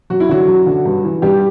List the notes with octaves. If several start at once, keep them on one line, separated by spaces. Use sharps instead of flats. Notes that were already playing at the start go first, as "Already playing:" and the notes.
F#2 F#4
E4
D3 F#3 F#4
F#2
D3 F#3
G2
E3
G2 G3 G4